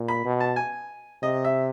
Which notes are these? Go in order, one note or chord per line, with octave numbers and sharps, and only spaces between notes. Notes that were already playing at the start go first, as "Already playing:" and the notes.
Already playing: A#2
B5
B2
A5
G#5
C3 D#5
E5